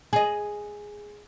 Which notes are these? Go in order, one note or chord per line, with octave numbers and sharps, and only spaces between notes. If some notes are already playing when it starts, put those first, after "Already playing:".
G#4 D#5